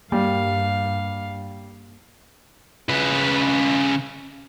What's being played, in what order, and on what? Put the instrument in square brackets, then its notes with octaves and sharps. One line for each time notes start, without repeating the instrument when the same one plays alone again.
[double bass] G2 [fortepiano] G3 [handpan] A#3 [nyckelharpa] F5
[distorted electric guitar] C#3 B4